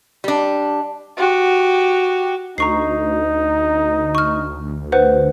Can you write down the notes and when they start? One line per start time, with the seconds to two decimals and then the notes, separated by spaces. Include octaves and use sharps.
0.24 G3 D4
1.17 F#4 G4
2.58 D2 D#4 A#5 C#6 C7
4.15 C#6 F6
4.92 B4 C5 F#5